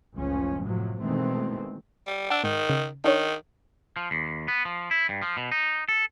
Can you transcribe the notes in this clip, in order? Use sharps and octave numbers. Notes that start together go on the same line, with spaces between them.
F#1 C#2 A2 F3 C#4
A2 C3 F3 F#3
B2 D#3 E3 G#3 A3 C4
G3
D4 F#5 E6
G#2 D#3
C#3
D#3 D4 D#4 C#5
F3
D#2
B3
F3
E4
G2
F3
B2
D#4
A4